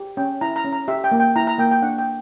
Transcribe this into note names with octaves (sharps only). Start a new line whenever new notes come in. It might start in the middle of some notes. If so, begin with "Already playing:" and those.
Already playing: G4
C#4 G5
E4 A#5
A#5
C#4
A#5
G4 E5
G5
A#3
G5
E4 A#5
A#5
A#3 G5
G5
D4 F#5
G5